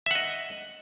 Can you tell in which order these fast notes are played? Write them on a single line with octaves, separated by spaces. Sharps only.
E5 F#5 D#5